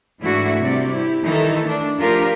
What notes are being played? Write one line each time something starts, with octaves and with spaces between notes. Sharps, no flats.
G#2 E3 A3 D4 E4 F#4
C3 G3 D5
E4 G4
D#3 E3 G3 D#4 E4 A4
A3 D4
F3 A3 D4 F4 G4 A#4